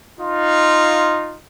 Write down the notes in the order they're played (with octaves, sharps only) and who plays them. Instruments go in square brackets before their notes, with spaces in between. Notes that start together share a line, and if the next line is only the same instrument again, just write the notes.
[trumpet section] D#4 F4